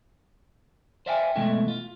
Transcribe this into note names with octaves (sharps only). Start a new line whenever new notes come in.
C5 D5 E5 F5 G5 G#5
B2 E3 G#3 A3 E4
F4